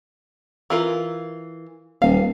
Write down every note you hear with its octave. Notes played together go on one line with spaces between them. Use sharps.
E3 F4 A#4
D#1 F5